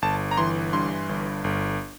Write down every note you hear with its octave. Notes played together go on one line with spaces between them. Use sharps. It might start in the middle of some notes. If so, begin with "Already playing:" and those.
G1 A5
A#5
E3 C6
G2 C6
G1
G1